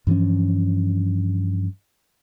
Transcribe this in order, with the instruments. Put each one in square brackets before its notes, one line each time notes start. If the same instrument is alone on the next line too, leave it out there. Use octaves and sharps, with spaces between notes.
[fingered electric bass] G2 E3 F3 C#4